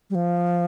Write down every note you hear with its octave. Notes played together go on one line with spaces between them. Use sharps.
G3
F3